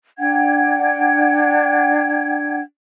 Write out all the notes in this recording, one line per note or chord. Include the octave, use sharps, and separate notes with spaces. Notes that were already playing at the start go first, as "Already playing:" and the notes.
D4 F#5 G5 G#6